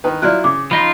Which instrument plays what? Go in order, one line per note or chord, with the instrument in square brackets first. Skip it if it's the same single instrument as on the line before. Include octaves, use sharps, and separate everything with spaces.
[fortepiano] D#3 B4
[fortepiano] F#3 E4 F4 [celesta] D5 F6 F#6
[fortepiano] C#3 [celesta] D6
[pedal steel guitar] F3 D#4 F4 [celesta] B5